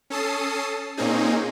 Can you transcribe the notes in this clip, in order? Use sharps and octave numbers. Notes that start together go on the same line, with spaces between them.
C#4 A4 A5 D#6 C7
A#2 A#3 C4 C#4 D#4 G#4